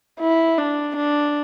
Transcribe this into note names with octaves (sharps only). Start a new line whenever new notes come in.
E4
D4
D4